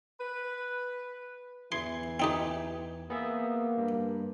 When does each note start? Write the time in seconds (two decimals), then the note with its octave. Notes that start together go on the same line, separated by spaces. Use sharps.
0.19 B4
1.72 E2 E3 C6 G#6
2.20 C4 D#4 G4
3.10 A#3 B3 G#4 E5
3.78 G2